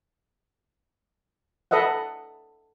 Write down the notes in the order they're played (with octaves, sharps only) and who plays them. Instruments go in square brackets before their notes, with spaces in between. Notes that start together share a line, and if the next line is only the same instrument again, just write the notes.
[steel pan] A4 B4 D#5 E5 F#5